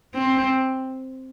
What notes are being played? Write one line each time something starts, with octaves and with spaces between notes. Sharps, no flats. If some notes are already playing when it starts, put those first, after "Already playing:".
C4